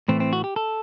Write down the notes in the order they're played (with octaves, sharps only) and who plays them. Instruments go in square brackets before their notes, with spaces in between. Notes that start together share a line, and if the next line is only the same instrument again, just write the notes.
[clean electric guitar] A2 E3 A3 C4
C4
F#4
G4
A4